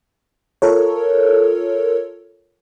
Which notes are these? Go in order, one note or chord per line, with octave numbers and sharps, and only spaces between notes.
F4 A4 A#4 C#5